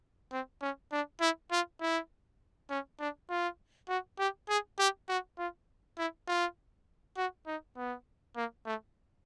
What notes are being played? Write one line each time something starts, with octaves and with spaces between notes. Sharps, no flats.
C4
C#4
D4
E4
F4
E4
C#4
D4
F4
F#4
G4
G#4
G4
F#4
F4
E4
F4
F#4
D#4
B3
A#3
A3